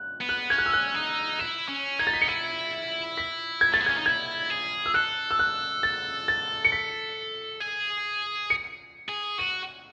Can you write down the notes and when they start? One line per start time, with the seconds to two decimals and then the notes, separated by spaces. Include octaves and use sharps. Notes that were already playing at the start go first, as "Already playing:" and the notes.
Already playing: F#6
0.21 B3
0.29 F#6
0.50 C#4 G#6
0.58 F#6
0.66 E6
0.73 F#6
0.95 D#4
1.39 E4 E7
1.68 C#4
1.99 D#4 G#6
2.07 A6
2.14 B6
2.21 C#7
2.28 E4 D#7
3.17 B6
3.61 G#6
3.72 A3 A6
3.81 B3
3.86 C#4 G#6
3.97 D#4
4.06 E4 G#6
4.50 G#4
4.86 E6
4.94 A4 F#6
5.31 E6
5.39 F#6
5.83 A6
6.28 A6
6.65 C#7
6.72 B6
7.60 G#4
8.50 C#7
9.09 G#4
9.38 F#4 D#7